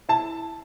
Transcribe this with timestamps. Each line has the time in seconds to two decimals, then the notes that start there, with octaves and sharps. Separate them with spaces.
0.09 E4 A5